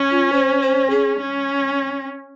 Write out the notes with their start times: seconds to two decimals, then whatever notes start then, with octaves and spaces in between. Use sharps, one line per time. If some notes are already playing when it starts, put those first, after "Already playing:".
Already playing: C#4
0.11 F4
0.32 C5
0.62 C5
0.90 G#4
1.20 C#4